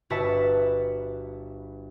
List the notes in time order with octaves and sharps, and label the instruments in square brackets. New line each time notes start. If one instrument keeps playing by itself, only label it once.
[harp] G1 F#4 B4 E5 A5